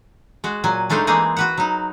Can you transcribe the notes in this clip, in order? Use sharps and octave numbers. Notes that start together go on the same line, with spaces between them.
G#3 F#4
A#2 F#3 G#5
G#3 A3 D4 D#4 C5 F5
E3 G#3 A#3 C4 D#4 G#4
F#4 B4 F#5
F#3 D#4